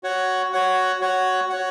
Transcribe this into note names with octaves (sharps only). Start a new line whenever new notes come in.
F#4 C#5 F#5
F#4 C#5 F#5
F#4 C#5 F#5
F#4 C#5 F#5